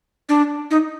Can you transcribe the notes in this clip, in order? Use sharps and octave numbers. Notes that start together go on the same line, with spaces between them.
D4
D#4